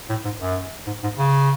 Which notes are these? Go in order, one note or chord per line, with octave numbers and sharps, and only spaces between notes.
A2
G#2
F#2
G#2
G#2
C#3